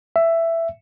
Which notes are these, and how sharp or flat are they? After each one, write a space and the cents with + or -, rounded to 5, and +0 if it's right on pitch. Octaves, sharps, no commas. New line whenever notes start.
E5 +10